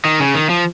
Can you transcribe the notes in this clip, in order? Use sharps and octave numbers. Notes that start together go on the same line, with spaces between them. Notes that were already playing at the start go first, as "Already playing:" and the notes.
D#3
C#3
D#3
F3